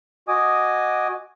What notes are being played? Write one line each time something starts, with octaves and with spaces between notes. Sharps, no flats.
F#4 D#5 G#5 D6 D#6